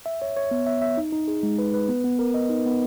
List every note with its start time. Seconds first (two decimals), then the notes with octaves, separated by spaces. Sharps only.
0.06 E5
0.22 C#5
0.36 C#5
0.51 B3
0.67 E5
0.82 E5
0.97 D#4
1.12 D#4
1.28 G#4
1.43 G#3
1.59 B4
1.74 B4
1.89 B3
2.04 B3
2.19 A#4
2.34 D#5
2.50 D#4
2.66 B3